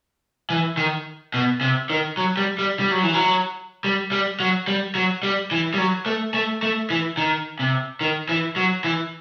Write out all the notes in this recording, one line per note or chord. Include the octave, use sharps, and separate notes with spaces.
E3
D#3
B2
C3
D#3
F#3
G3
G3
G3
F#3
E3
F#3
G3
G3
F#3
G3
F#3
G3
E3
G3
F#3
A3
A3
A3
E3
D#3
C3
D#3
E3
F#3
E3